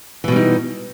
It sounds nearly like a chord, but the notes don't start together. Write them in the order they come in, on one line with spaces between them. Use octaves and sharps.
E3 B2 G3 D#4